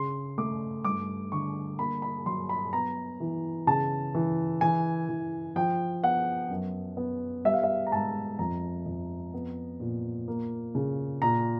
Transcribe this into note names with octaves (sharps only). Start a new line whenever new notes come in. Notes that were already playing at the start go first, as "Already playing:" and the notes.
Already playing: C#3 C6
A3 D6
G2 D6
D3 C#6
A#3 B5
B5
F#3 C6
B5
B3 A#5
E3
C#3 A5
E3
E3 G#5
E3
F3 G5
B3 F#5
F#2
B3
G3 E5
F5
E5
A#5
G#2 A5
F2 A#5
F2
B3
A#2
A#3
C#3
A#2 A#5